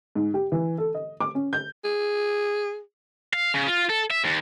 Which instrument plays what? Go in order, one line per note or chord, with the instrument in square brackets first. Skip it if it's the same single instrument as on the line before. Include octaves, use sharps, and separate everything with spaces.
[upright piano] G#2
G4
E3
A4
D#5
D6
C#4
G6
[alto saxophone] G#4
[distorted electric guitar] F5
C#3
F4
A4
E5
D#2